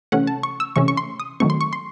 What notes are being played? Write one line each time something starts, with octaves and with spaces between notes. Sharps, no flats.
C3 E3 A3 C#4 F#5
A5
C#6
E6
C3 E3 A3 C#4 C#6
C#6
C6
D#6
D#3 F#3 A3 C4 C#6
C6
C#6
C6